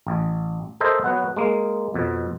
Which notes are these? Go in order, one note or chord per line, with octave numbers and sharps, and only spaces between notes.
A1
A4 A#4 C5 D#5 E5
F#3 B3 F#5
G#3 A#3
F2 B2